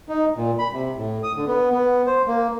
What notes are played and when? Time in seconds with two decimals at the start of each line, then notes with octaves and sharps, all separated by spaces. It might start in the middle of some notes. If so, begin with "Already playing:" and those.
0.09 D#4
0.36 A#2
0.59 B5
0.73 C3
0.96 A2
1.23 D#6
1.36 D3
1.48 B3
1.72 B3
2.06 C5
2.28 A#3